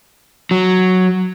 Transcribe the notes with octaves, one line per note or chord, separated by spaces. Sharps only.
F#3